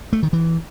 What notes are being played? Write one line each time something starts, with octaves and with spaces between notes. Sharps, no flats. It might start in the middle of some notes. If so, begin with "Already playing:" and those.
A3
D#3
E3